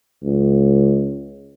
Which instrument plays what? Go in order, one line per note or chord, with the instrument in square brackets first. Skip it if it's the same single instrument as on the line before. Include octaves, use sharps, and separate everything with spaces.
[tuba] C#2